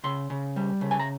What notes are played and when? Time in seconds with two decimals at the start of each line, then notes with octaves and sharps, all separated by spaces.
0.04 C#3 C6
0.30 C#3
0.56 G3
0.81 C#3
0.91 G#5
1.00 A#5